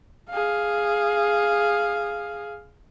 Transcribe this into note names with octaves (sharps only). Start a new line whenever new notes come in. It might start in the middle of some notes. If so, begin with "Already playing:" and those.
G#4 F5